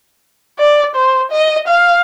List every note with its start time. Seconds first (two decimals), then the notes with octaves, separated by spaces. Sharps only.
0.59 D5
0.95 C5
1.31 D#5
1.68 F5